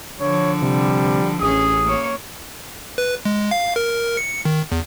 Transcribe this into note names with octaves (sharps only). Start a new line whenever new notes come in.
D3 F3 C#5
C3 G3
A1 C#4 G#4 D#6
A#3 C#5
B4
G#3
F5
A#4
C#7
D#3
E2